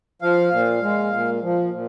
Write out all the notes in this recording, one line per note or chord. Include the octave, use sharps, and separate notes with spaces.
F3 F5
A#2
G#3
A#2
F3
A#2